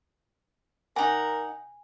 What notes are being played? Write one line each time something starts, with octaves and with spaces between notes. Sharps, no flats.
D#4 A#4 F#5 G#5